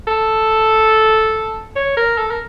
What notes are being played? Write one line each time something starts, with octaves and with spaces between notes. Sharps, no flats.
A4
C#5
A#4
A4
A#4